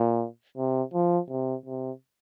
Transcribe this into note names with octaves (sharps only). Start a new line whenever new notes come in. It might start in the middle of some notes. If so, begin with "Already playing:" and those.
Already playing: A#2
C3
F3
C3
C3